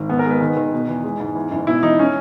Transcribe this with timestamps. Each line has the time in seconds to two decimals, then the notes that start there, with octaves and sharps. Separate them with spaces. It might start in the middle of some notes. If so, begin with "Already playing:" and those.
Already playing: G#1
0.09 G#2 B3
0.19 A#4
0.25 G#3 B4
0.41 D#3
0.56 D#3
0.72 B2
0.88 E2
1.04 G#3
1.20 G#2
1.35 E2
1.51 F#1
1.67 B2 E4
1.83 E1 D#4
1.99 C#4